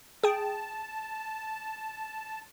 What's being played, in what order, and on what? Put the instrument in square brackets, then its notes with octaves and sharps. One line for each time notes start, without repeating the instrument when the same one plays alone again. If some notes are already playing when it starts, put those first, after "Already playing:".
[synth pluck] G#4 G5 [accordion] A5